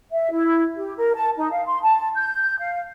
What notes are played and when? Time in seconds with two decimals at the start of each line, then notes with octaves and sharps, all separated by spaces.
0.12 E5
0.32 E4
0.76 G4
0.97 A#4
1.15 A5
1.37 D#4
1.52 F5
1.66 C6
1.82 A5
2.16 G6
2.59 F5